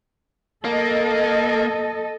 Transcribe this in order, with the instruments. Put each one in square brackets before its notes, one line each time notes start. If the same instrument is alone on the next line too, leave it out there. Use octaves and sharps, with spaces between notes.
[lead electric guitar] A#3 [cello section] A4 D#5